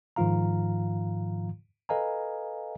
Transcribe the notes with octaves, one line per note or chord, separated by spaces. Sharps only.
G#2 D#3 F3 F4 F5 A#5
A4 B4 D#5 F5 G#5 A#5